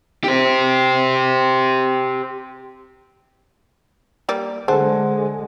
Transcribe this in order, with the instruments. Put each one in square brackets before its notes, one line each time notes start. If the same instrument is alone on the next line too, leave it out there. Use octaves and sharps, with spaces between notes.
[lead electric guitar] G4 C5
[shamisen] G3 A#3 D5
[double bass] D3 G#3 [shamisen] D4 [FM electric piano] G#4 F#5 [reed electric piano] A4 C5